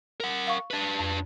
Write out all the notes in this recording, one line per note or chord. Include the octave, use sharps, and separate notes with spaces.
A#4 F#5
F5 C#6
D4 B4
F2